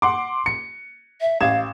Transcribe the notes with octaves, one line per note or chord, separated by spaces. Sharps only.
F#5 C6 D6
C#7
E5
A1 F5 G#6 E7